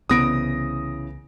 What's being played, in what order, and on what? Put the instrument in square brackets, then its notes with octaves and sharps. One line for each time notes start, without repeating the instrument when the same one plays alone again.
[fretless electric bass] C2 B3 [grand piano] C#3 E3 [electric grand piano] D#6 A#6 D7